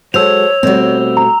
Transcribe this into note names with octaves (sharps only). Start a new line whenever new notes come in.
F#3 G#3 A4 C5 C#5 E6 F7
B2 G3 A3 C4 F#4
A#5